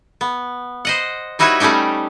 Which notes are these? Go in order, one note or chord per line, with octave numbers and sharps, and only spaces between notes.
B3
C5 D#5 F#5
G3 D#4 E4 F#4 B4 C#5
G3 A3 C#4 D#4 G4